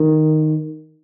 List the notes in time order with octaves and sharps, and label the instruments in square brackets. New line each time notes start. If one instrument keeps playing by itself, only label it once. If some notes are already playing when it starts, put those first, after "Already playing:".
Already playing: [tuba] D#3